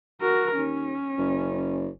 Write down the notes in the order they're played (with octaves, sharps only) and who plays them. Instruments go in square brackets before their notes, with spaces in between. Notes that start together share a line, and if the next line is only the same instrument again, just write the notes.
[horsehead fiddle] F#4 A#4
[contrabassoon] D#2 [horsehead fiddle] C#4
[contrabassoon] F#1